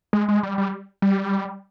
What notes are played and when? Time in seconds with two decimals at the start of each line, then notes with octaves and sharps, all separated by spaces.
0.13 G#3
0.28 G#3
0.43 G3
0.58 G3
1.02 G3